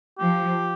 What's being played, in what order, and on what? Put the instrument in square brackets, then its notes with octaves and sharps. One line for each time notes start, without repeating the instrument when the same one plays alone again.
[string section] F3 [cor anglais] G4